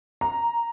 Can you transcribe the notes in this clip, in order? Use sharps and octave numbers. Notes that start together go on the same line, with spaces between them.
A#5